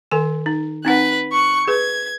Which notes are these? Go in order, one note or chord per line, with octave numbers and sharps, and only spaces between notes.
D#3 A4 G#5
D#4
C4 D#4 B4 F#5 F#6
C#6 F#6
G#4 B4 G#6